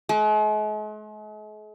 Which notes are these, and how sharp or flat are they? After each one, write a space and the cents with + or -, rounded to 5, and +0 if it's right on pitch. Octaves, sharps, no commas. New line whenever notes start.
G#3 +45